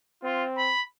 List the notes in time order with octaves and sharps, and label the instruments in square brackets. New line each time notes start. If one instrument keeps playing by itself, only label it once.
[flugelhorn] C4 [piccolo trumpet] F4
[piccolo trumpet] B5